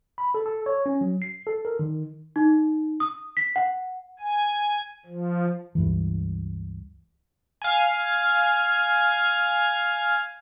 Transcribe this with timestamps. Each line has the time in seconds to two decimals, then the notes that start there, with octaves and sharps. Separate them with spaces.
0.18 B5
0.34 A4
0.46 A4
0.66 C#5
0.86 C#4
1.01 F#3
1.22 C7
1.47 A4
1.65 A#4
1.79 D#3
2.36 D#4
3.00 D#6
3.37 B6
3.56 F#5
4.20 G#5
5.06 F3
5.75 C#2 G2 E3
7.62 F5 G#5